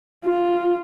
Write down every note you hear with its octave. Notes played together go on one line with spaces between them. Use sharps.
F4